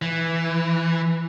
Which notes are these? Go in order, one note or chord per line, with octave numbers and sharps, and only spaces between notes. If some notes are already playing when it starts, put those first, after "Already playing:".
E3